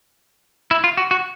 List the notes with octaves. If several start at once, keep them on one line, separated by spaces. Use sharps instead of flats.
E4
F4
F#4
F#4